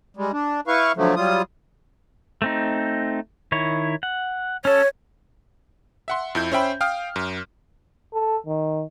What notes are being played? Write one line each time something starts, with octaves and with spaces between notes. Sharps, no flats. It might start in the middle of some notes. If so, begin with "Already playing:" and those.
G3 G#3
D4
E4 B4 F5 C#6
D3 F3 F#3 A3
F#3 G3 F4 D#6
A3 C4 D#4
D#3 E4 C#5
F#5
C#4 A4 C#5
E5 F#5 C6
F2 E4 G6
C#4 C5 E5 G5 B5
F5 G5 D#6 F6
F#2
A4
D#3